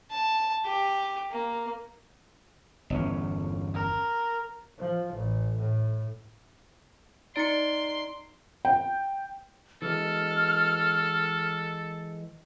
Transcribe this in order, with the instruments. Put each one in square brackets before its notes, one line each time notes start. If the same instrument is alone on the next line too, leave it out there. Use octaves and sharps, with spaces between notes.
[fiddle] A5
G4
A#3
[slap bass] G1 E2 C#4
[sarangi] A#4
[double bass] F3
A1
A2
[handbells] D#4 D7 [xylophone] D5 A6 C#7 [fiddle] C6
[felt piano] G5
[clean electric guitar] E3 G#3 [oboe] A4 [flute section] F6